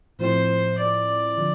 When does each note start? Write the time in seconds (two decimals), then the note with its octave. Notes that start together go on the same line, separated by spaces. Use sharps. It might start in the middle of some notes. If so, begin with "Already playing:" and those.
0.19 A2 F3 C4 E4 C5
0.78 D5
1.37 D3 F3